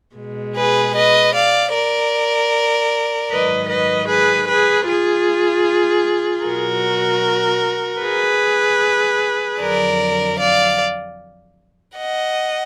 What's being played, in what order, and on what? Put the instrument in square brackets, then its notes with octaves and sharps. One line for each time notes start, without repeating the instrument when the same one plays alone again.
[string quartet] B2 G#3
G#4 B4
B4 D#5
D5 F5
A#4 D5
G#2 D#3 F#3 B4 D#5
B4 D#5
G#4 B4
G#4 B4
F4 G#4
B2 F#3 F#4 A#4
G#4 B4
F2 D3 F#3 A#4 D5
D5 F5
D#5 F#5